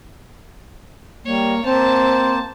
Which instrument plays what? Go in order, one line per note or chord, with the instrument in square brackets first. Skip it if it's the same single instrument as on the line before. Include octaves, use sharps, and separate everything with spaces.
[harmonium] G3 [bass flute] A#3 [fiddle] C#5
[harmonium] A#3 C5 [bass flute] C4 [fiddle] A5